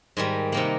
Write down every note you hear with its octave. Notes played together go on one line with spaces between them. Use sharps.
G#2 D#3 G3
C3 D#3 A#3